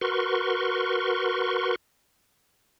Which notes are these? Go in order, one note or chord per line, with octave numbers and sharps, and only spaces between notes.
F#4 A#4 B4 C6 C#6